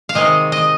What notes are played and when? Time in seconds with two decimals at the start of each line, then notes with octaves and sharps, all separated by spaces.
0.09 F5
0.15 C3 D#3 G#3 D#5
0.52 D#5